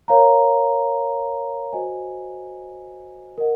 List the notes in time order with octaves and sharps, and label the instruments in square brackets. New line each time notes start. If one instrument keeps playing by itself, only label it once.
[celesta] A#4 C#5 F5 A#5
F#4 C5 D#5 G#5
A#4 D#5 F#5